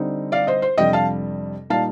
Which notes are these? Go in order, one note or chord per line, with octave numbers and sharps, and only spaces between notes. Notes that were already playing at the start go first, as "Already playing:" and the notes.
Already playing: D3 G3 C4 D#4
D5 F5
C5 D#5
C5
F2 C3 G3 D4 D#5 G5
F5 A5
A#2 G3 A#3 D#4 F5 A5